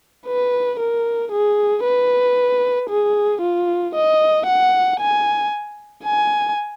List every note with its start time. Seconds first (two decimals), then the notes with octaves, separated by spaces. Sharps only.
0.27 B4
0.80 A#4
1.32 G#4
1.84 B4
2.90 G#4
3.42 F4
3.95 D#5
4.47 F#5
5.00 G#5
6.05 G#5